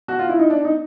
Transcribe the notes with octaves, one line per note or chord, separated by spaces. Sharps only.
F#4
F4
E4
D#4
D4
D#4